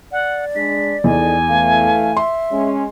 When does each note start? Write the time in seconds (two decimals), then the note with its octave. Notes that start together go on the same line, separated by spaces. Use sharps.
0.12 D5 F#5
0.55 G#3 D4 B6
1.04 E2 D#3 A4 D#5 G#5
1.48 E3 A3 F5
2.17 E5 C6
2.51 G#3 C#4